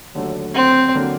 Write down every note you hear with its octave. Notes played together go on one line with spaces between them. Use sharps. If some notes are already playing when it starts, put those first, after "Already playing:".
D#2 D3 F#3 A3
C4
D3 F#3 A#3